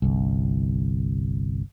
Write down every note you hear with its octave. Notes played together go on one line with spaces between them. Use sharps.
G1 C2